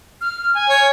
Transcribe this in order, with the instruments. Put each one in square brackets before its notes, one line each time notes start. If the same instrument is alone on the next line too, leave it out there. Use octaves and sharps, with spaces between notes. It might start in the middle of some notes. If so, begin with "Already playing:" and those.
[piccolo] F6
G#5
[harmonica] C#5